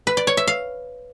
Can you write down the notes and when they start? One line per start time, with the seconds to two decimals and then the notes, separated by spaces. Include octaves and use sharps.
0.07 B4
0.17 D5
0.27 C#5
0.37 E5
0.47 F5